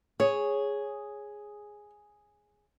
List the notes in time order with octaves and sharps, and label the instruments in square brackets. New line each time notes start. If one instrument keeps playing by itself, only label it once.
[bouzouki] G#4 [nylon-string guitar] C#5